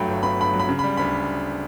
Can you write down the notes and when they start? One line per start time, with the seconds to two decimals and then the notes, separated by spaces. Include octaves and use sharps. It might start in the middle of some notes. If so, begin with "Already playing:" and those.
Already playing: G2 F#3 A3 G5 B5
0.08 G1
0.23 B3 B5
0.38 G2 B5
0.53 F#3
0.60 B5
0.69 C#3
0.79 B5
0.84 G3
0.97 D2 B5